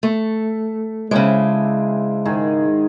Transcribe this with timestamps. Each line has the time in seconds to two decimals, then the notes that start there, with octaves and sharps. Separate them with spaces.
0.03 A3
1.11 C#3 G#3 C4 D4 E4
2.25 G#2 D#3 G#4